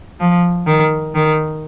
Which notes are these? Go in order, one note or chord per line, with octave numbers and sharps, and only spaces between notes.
F3
D#3
D#3